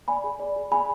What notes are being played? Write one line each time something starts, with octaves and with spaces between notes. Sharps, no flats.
D5 G#5 B5
G#4
D5
G#4
G#4 G#5 B5